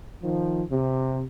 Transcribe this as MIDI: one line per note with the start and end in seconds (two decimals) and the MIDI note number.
0.22 0.62 51
0.22 0.62 53
0.70 1.22 48